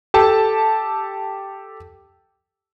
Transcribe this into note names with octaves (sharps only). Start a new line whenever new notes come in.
G4 A4 A5